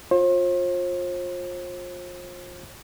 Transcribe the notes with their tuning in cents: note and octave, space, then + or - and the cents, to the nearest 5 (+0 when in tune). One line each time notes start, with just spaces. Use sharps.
F4 +25 C5 +40